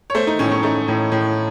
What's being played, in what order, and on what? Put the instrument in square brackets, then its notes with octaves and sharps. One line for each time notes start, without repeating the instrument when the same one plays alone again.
[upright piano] C#5
A3 C5
D#4
A2 C#4
C#4
A3 D#4
A2
A2